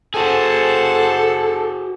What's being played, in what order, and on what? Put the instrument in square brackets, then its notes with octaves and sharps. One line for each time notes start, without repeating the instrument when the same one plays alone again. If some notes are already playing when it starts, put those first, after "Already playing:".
[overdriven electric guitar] F#4 G#4 [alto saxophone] A4 [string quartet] C5 F#5 A5